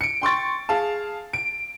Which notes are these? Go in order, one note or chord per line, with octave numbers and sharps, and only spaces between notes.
C#7 D7
G5 C6 C#6 A6
G#4 F5 A5
D7